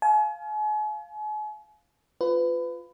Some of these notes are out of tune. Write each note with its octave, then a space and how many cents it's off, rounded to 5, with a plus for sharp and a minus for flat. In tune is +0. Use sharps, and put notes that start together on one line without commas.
F5 +0 G#5 +40
F4 +0 B4 +25